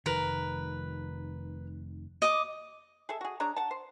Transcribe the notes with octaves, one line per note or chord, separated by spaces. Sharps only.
F1 D#3 A#4 B4
D#5 D6
G#4 A4 E5
F#4 G#4
D4 G#4 C#5 A#5
F#5 A5
C5